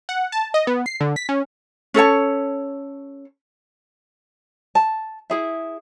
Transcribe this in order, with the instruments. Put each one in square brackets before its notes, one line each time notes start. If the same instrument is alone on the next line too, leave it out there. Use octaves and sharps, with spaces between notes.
[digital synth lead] F#5
A5
D#5
B3
C7
D3
B6
C#4
[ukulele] C#4 A4 C#5 A5
A5
E4 G#4 E5